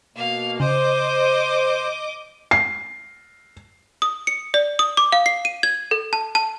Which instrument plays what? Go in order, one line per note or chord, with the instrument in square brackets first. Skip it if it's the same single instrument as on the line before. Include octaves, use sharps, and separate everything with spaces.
[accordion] B2 A#3 [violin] F5
[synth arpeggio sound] C#3 [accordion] C5 [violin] D#5 D6
[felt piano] C7
[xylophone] D#6
C#7
D5
D#6
D6
F5
C7
D#7
G#6
A4
A5
A5